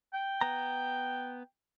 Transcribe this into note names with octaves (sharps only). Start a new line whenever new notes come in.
G5
B3 A#5